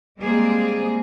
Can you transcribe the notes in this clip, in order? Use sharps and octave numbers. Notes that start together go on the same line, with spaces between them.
G3 G#3 A#3 C4 G#4